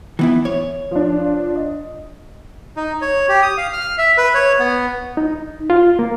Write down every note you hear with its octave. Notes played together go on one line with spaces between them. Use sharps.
E3 B3 E4
C#5
F3 D4
D#5
D#4
C#5
G4
D#6
F5
F6
E5
B4
C#5
B3
D#4
F4
A#3